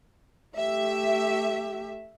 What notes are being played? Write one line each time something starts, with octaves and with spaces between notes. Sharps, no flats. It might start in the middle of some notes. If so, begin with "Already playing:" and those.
A3 G4 E5